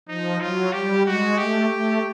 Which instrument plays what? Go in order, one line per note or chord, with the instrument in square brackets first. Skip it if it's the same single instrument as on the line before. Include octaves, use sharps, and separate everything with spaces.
[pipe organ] F3 [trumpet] D#4
[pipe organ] F#3 [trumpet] F4
[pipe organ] G3 [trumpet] G4
[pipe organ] G#3 [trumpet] F#4
[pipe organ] A3 [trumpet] G4
[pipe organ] A3